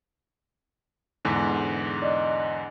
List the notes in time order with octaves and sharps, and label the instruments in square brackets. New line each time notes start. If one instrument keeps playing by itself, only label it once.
[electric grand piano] E2 G#2 D3
[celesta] D5 D#5